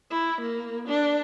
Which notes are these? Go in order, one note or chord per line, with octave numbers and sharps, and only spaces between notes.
E4
A#3
D4